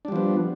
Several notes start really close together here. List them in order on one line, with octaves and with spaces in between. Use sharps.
D4 G3 F3 B3